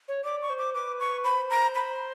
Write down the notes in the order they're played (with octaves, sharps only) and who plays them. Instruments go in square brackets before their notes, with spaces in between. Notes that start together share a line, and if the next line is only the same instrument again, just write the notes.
[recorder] C#5
[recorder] D5 [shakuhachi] D6
[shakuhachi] C#6
[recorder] C5
[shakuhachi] D6
[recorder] B4 [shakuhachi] D6
[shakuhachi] C#6
[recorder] C5 [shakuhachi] B5
[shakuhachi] A#5
B5